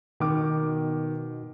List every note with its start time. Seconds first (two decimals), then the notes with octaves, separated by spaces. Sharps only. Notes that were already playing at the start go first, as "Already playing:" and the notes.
0.20 B2 D#3 D6